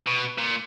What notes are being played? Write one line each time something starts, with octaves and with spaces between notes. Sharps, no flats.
B2
A#2